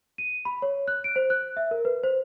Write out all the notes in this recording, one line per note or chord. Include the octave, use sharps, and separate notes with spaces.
D#7
B5
C#5
F#6
D7
C5
F#6
E5
A#4
B4
C5